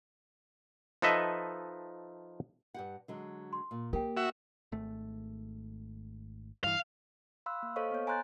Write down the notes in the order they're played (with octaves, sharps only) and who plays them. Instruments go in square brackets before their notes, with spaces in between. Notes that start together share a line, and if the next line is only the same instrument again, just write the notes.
[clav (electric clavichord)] F3 D#4 A4 B4 D#5 E5
[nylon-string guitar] G2 G4 F#5
D3 F#3 G#3
[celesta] C6
[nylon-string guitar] A#2
[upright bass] A#3 [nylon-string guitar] G4 [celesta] A#4 G5
[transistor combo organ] F#4 E5
[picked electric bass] G#1 A3
[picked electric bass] G2 E3 [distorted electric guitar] F5
[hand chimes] F5 B5 C6 E6 F#6
A#3
A4 C5 C#5 D#5 F5 C#6
B3 C#5
G#5 A#5 C6 F#6 G6 A6